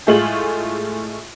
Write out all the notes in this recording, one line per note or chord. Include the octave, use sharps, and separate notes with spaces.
A2 G#3 A3 F4 G#4 F#7